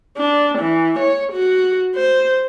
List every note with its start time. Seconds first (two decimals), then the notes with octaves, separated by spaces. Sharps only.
0.17 D4
0.59 E3
0.99 C#5
1.32 F#4
1.96 C5